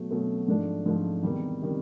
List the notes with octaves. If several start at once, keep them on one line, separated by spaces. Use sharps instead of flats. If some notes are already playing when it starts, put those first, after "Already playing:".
Already playing: B2 F#3 A3
B2 F#3 A3
G#2 F3 A3 D4
G#2 F3 A3 D4
E2 C3 D#3 G3
C3 D#3 G3